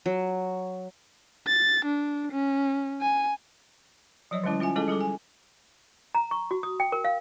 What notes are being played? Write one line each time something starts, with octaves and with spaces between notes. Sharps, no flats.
F#3
A6
D4
C#4
G#5
F3 F#3 C#5 D#5
D3 G3 G#3 C#4 E4
C#4 F4 E5 G#5
G#3 C#4 E4 G#4 A4 D#5
G3 G#4 A4 D6
G#5
A#5
C#6
F#4
D#6
G5
A#4
F5